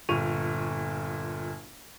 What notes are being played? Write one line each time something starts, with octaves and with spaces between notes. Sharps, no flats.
G1 A#2 C#6 D#7 F7